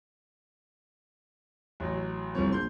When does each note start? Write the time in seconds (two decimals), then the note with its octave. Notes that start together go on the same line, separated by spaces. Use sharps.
1.80 A1 F#3
2.35 G1 C2 F3 C#5
2.52 A#1 C6 G6